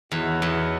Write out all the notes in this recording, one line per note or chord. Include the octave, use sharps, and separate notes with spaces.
E2 B3 D#4 F#4 C#5 E5
E2